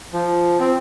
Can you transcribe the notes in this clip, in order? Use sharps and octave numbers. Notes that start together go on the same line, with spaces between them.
F3
C4